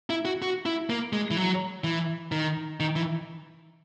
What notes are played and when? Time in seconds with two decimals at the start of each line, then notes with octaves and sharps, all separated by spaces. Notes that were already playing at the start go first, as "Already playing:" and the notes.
0.10 E4
0.25 F#4
0.42 F#4
0.66 E4
0.90 A#3
1.13 G#3
1.31 E3
1.37 F#3
1.84 E3
2.32 D#3
2.80 D#3
2.96 E3